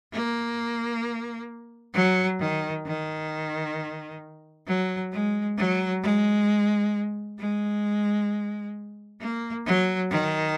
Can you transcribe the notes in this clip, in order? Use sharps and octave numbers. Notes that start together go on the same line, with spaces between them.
A#3
F#3
D#3
D#3
F#3
G#3
F#3
G#3
G#3
A#3
F#3
D#3